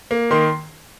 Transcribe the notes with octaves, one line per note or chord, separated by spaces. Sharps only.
A#3
D#3 C6